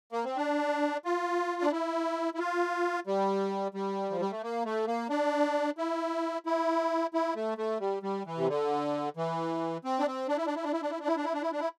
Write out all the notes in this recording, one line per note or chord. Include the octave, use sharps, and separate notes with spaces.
A#3
C4
D4
F4
D4
E4
E4
F4
G3
G3
F3
G3
A3
A#3
A3
A#3
D4
E4
E4
E4
A3
A3
G3
G3
E3
C3
D3
E3
C4
D4
C4
D4
E4
D4
E4
D4
E4
D4
E4
D4
E4
D4
E4
D4
E4
D4
E4